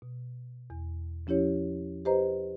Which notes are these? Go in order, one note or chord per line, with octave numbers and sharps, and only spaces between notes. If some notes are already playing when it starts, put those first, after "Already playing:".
B2
E2
F3 C#4 E4 G4 C#5
G4 B4 C5 D#5 A#5